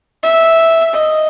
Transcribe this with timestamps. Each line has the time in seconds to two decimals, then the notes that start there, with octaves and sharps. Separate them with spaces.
0.24 E5
0.94 D#5